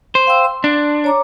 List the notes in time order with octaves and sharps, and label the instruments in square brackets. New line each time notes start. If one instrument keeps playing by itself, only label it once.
[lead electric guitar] C5
[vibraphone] F5 G5 E6
C6
[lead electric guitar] D4
[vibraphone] C#5 A#5 D6